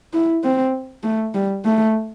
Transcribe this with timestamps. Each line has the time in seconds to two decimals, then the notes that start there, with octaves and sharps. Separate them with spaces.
0.13 E4
0.44 C4
1.04 A3
1.35 G3
1.65 A3